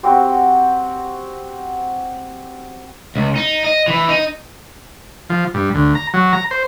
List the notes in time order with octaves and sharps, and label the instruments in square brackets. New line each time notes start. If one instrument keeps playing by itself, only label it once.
[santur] C4 F#4 G4 C5
[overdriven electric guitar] C#2
D#4
D#5
E3
D#4
[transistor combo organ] F3
G2
D2
A#5
F#3
A#5
C5